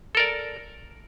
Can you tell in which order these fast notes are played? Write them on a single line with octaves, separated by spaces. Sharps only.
A4 A#4 D5